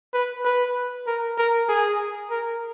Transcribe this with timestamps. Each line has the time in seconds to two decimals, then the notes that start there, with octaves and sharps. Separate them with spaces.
0.14 B4
0.45 B4
1.07 A#4
1.38 A#4
1.69 G#4
2.31 A#4